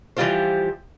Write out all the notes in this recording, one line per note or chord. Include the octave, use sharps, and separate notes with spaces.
E3 F3 G3 F4 G4 C5